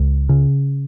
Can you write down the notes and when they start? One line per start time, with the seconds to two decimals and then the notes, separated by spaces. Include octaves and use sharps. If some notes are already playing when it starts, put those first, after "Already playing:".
Already playing: C#2
0.29 C#3